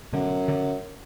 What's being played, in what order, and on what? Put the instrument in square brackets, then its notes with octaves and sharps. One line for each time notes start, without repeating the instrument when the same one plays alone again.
[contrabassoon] F#2 [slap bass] B2 D3
[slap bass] D3 F#3